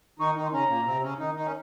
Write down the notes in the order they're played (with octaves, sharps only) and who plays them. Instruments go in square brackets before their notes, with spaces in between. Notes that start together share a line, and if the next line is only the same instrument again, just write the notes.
[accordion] D#3 D#4 [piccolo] C#6
[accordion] D#3 D#4
[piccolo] C6
[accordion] C#3 C#4 [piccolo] A#5
[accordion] A#2 A#3
C3 C4
C#3 C#4
D#3 D#4
D#3 D#4
C#4